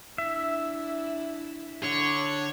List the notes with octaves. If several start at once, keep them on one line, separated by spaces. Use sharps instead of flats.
D4 E4 E5
D3 C#5